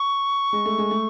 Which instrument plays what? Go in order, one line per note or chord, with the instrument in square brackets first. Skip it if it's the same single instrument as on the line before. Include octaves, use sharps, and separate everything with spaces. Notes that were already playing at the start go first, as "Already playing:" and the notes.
Already playing: [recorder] C#6
[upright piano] G#3
A3
G#3
A3